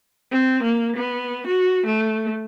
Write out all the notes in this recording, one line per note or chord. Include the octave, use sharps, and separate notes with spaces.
C4
A#3
B3
F#4
A3